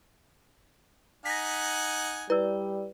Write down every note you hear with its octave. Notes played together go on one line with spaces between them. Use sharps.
D#4 F#5 G#5 A#6 B6
G3 E4 B4 D5 E6